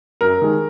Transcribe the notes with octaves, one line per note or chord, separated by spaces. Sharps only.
F#2 A#4
D#3 G#3